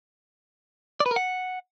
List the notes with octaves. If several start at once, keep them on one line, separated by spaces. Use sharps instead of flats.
D5
B4
A#4
F#5